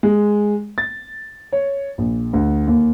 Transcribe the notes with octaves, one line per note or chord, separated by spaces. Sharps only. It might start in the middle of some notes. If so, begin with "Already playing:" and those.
G#3
A6
C#5
A#1
D2
D#2